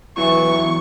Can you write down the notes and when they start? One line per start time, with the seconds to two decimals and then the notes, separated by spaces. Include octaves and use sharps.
0.18 E2 E3 F#3 E4 C#6